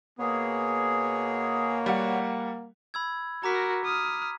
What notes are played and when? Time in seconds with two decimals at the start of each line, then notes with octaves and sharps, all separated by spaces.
0.19 B2 A#3 B3 G#4 C#5
1.86 G3 F#5
2.94 B5 E6 G#6
3.44 F#4 A#4 A#5 D6 B6
3.85 D#6 F6